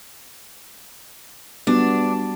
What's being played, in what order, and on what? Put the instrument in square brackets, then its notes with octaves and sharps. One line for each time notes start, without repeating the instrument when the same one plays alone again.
[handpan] G3 B3 F#4 [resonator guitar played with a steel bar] D4